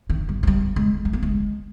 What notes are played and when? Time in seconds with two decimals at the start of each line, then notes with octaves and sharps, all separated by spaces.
0.09 D#3
0.29 G3
0.43 F3
0.47 G3
0.76 G#3
1.05 G#3
1.13 A#3
1.23 G#3